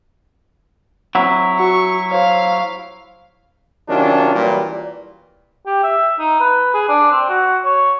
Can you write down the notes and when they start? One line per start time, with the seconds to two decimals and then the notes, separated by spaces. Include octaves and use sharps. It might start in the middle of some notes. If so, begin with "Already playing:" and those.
1.15 F#3 C4 E4 F#5
1.60 F#4 C#6
2.11 C5 C#5 F5
3.88 C3 D#3 F#3 C#4 D4 F4
4.34 A#2 E3 F#3 G3
5.66 G4
5.83 E5
6.20 D#4
6.40 B4
6.74 G#4
6.89 D4
7.12 C4
7.29 F#4
7.65 C#5